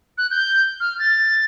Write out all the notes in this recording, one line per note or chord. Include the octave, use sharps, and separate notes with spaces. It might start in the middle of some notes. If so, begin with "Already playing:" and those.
F#6
G6
F6
A6